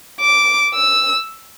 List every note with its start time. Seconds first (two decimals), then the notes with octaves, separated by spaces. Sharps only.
0.21 D6
0.75 E6